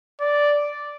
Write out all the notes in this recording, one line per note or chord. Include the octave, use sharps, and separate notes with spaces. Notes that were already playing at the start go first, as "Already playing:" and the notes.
D5